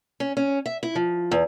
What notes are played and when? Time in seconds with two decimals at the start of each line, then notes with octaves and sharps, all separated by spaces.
0.20 C#4
0.37 C#4
0.66 E5
0.83 E4
0.95 F3
1.31 E2